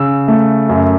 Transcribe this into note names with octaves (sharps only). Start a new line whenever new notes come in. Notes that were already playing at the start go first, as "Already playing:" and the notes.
Already playing: C#3 E6
A3
F#2